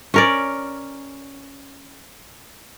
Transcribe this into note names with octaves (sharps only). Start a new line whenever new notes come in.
C#4 A#4 D5